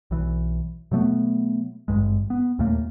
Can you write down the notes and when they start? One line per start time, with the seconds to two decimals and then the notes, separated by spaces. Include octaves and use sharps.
0.11 B1 E3
0.91 B2 F#3 A3 B3
1.88 G#1 E2 G2 G#3
2.30 B3
2.59 D#2 A#2 A3 A#3